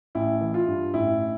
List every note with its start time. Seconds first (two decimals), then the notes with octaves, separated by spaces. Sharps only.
0.15 A1 E4
0.41 E3
0.54 F4
0.67 G2
0.93 A1 E4